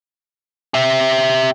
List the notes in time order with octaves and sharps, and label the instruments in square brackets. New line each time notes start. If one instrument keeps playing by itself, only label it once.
[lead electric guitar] G4 E5